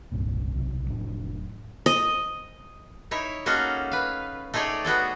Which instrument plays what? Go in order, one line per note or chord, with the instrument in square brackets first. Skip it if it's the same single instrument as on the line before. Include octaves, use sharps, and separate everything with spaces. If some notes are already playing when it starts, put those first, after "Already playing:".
[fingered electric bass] F1 C2 G2 A#2
D1 B1 C3 F#3
F1 A2 F#3 D4
[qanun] D#5
[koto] D#4 E4 C#5
A#3 C#4 D#4 F#4 G#4 A4
B4 F5
A3 D#4 G#4 C#5 D5 G5
B3 F#4 G#4 A4